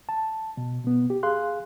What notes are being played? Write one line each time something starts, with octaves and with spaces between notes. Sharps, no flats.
A5
B2
B2 B3
G4
G#4 F5 C6 F#6